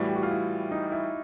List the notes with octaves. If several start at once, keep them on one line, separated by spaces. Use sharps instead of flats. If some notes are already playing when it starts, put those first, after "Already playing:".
Already playing: A2 E3 G3 F#4
G4
F#4
F4
E4
D#4
E4